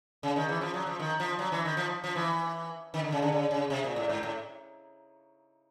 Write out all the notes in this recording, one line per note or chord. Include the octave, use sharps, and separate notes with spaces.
C#3
D#3
E3
F3
F#3
F3
D#3
F3
F#3
E3
D#3
F3
F3
E3
D#3
D3
C#3
D3
C#3
C#3
C3
A#2
A2
G#2
A2